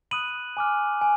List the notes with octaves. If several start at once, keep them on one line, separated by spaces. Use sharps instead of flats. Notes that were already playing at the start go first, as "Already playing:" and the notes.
B5 D#6 F#6 D#7 F#7
G#5 D6 F6
G#5